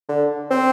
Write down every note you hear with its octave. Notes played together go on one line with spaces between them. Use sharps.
D3
C4